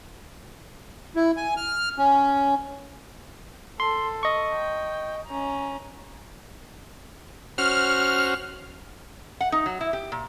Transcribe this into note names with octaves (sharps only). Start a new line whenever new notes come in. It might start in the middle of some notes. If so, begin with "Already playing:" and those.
E4
G#5
F6
C#4
A4 C6
D#5 C#6
G5
C#4 A#5
C#4 F#4 C5 F6
F#5
D#4
F#3
E4
G4
A#2